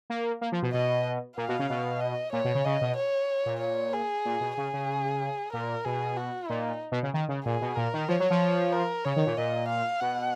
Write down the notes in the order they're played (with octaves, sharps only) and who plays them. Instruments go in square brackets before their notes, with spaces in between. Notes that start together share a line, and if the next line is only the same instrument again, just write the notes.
[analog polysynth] A#3
A#3
F3
B2
[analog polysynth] B2 [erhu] D#5
[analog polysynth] A#2 [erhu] F5
[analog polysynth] B2
C#3
B2
[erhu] D#5
[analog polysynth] A#2 [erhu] C#5
[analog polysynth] B2
C#3
[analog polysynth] C#3 [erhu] D#5
[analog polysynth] B2
[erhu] C#5
[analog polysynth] A#2
[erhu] C#5
G#4
[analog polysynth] A#2
B2
[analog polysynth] C#3 [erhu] G#4
[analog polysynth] C#3
[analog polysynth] A#2 [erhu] A#4
[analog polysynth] B2 [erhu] G#4
[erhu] F#4
[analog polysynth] A#2 [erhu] D#4
[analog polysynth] B2
C#3
D#3
C#3
[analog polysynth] A#2 [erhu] G#4
[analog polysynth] B2
[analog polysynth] A#2 [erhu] A#4
[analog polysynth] D#3
[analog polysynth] F3 [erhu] C#5
[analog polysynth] F#3
F3
[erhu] A#4
[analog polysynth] C#3 [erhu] C#5
[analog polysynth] D#3
A#2
[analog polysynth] A#2 [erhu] D#5
[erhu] F5
[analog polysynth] B2 [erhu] F#5